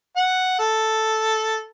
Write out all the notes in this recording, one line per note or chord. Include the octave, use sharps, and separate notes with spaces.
F#5
A4